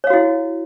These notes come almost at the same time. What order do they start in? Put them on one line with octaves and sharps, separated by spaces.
C#5 F5 F#4 E4